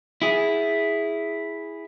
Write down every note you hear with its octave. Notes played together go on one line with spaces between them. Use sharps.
E4 G#4